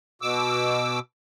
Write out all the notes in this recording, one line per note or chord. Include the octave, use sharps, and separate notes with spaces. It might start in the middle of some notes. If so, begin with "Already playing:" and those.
B2 D6 E6